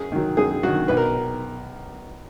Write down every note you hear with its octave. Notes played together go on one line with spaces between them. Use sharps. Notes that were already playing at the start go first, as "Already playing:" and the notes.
Already playing: F#2 G#4
D#3 F#3
F#2 G#4
D#3 F#3 F#4
B1 B4
A#4